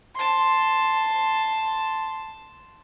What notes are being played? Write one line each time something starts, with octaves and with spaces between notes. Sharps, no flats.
A5 C6